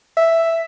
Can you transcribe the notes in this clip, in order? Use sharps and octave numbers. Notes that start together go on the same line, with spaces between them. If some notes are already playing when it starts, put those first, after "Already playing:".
E5